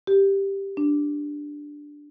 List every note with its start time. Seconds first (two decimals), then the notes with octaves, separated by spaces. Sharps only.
0.07 G4
0.77 D4